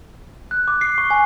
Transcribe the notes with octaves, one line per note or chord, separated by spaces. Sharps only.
F#6
D6
C7
C#6
G#5